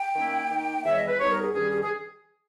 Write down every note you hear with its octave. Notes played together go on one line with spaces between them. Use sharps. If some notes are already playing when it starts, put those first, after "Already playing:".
Already playing: G5
D#3 A#3 C#4 E4
D#3 A#3 D#4
E2 D#3 G3 E5
C#5
D#5
B4
G2 G3 B3 D#4 C#5
A#4
G#4
G2 D#3 G3 C#4 G#4
G#4
G#4